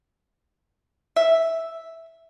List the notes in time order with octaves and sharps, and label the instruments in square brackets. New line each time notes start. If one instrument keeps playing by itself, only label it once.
[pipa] E5